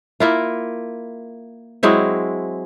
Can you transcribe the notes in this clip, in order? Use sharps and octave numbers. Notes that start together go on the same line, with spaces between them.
A#3 E4 F4
F#3 G#3 C4 E4